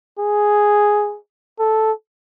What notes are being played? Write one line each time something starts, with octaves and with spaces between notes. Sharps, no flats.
G#4
A4